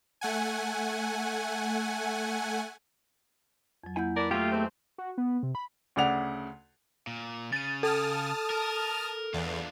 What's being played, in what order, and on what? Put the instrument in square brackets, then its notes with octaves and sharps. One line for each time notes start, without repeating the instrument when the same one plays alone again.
[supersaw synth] A3 F#5 G#5
[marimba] F2 F#3
[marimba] A#3 F#5 G6 [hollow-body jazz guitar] E4 G#5
[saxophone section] A#4 B4 D5
[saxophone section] F#3 F4 [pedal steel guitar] A3 G4 [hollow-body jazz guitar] A#3 [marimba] D6
[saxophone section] E3 G#3 C4 [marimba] A5 C6
[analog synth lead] F#4
B3
C3
B5
[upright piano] D2 C#3 D5 F#5 F7
[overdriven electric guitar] A#2
[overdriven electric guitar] C#3 [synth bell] A6 D#7
[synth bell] A4 [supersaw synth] A5 D#6 F6
[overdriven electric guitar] A#4
[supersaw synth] E2 [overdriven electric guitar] D4 F4